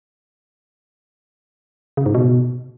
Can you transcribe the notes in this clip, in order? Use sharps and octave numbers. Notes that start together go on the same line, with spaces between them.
C#3
G#2
B2